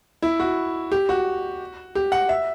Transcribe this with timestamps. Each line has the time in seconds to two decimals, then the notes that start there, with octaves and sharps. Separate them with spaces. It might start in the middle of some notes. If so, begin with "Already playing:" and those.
0.22 E4
0.40 F#4
0.92 G4
1.09 F#4
1.95 G4
2.12 F#5
2.29 E5